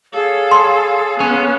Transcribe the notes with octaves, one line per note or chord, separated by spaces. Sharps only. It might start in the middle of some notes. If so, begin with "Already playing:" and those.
G#4 A4 C#5 F5
C6
B3 C#4